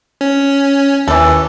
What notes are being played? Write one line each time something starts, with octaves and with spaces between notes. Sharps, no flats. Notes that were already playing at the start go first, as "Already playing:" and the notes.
C#4
D#2 E3 A4